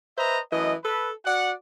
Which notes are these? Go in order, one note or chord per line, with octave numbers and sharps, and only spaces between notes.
B4 C5 D#5 E5 A#5
F#2 E3 A3 D#5
A4 B4
F#4 D5 F#5